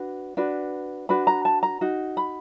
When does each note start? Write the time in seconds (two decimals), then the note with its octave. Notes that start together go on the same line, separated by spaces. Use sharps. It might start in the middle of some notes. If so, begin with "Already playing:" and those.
Already playing: D4 F#4 B4
0.37 D4 F#4 B4
1.09 D4 F#4 B4 B5
1.27 A#5
1.45 A5
1.63 A#5
1.81 D#4 F#4
2.17 B5